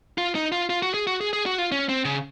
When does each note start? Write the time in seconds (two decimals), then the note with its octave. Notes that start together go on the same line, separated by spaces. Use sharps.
0.18 F4
0.35 D#4
0.52 F4
0.70 F4
0.82 F#4
0.94 G#4
1.07 F#4
1.21 G#4
1.33 G#4
1.46 F#4
1.58 F4
1.72 C#4
1.89 C4
2.05 C#3